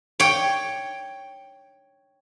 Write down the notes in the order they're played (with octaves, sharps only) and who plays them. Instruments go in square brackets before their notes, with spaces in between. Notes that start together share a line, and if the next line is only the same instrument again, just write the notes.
[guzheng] C#5 G5